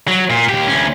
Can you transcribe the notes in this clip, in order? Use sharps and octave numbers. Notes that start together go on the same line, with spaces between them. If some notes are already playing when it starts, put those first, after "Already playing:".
F#3
A#2
D#2 G4
D2 C#4